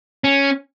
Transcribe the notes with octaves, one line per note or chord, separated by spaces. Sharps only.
C#4